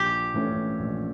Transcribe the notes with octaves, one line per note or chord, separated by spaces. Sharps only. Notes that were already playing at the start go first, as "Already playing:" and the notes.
Already playing: A#1 G4
A2 E3 A3 C#4
A#1